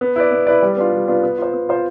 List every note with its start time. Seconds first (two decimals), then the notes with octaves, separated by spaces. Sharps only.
0.01 B3
0.16 E4 B4 D5
0.31 B3
0.47 E4 B4 D5
0.62 G3
0.77 B3 D4 F4
0.93 G3
1.08 B3 D4 F4
1.23 B3
1.38 F4 C5
1.53 B3
1.69 F4 C5